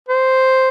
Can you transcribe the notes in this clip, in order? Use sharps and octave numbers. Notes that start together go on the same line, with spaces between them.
C5